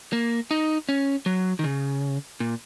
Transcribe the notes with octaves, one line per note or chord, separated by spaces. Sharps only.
A#3
D#4
C#4
F#3
D#3
C#3
A#2